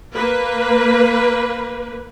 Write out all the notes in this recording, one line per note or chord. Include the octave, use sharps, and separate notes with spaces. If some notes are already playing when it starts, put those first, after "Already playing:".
A#3 B4